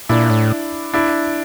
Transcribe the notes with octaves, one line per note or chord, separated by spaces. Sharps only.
A#2 D4 E4
A2
D4 E4